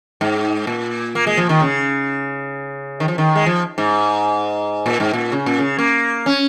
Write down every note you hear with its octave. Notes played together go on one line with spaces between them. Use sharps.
G#2
A#2
A#3
G#3
F3
D#3
C#3
D#3
F3
D#3
G#3
F3
G#2
A#2
G#2
A#2
C#3
A#2
C#3
A#3
C#4